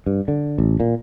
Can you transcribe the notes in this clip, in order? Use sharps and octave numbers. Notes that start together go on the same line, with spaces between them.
G2
D3
A1
A#2